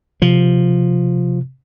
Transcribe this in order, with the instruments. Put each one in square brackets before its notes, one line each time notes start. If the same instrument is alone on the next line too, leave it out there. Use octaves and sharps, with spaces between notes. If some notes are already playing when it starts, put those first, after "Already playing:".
[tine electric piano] C3 [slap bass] F3